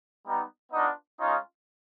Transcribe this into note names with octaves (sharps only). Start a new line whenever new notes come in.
G3 B3 D#4
B3 D4 D#4 F4 D#5
G#3 C#4 D#4 F4 D#5